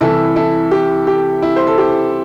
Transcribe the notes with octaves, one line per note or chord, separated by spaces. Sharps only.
C2 C3 E3 E4 A4
E4 A4
G4
G4
E4
C5
A4
G4